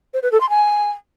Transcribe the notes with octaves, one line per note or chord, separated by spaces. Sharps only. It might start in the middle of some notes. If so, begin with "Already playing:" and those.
C5
B4
A4
C6
G#5